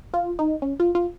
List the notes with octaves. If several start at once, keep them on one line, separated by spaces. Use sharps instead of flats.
F4
D#4
C#4
F4
F4